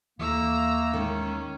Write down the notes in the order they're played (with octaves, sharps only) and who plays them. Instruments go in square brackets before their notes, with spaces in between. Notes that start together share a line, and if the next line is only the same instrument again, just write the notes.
[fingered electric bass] D#2 E3 [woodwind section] A3 A#3 [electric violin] A#5 E6
[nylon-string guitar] D#3 G#3 [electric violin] C#4